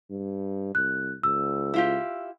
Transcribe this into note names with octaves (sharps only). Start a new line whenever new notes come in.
G2
C2 F#6
C#2 E6
E4 F4 G4